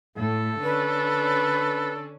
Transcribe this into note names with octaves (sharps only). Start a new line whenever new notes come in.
A2 A3 A4
D3 C#4 D4 B4